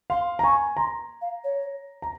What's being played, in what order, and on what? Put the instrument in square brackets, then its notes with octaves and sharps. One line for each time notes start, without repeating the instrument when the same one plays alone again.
[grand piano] F5 [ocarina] C6
[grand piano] A#5
[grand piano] G#5 [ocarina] C#6
[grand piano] A#5 [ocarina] C6
[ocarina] F5
C#5
[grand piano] A#5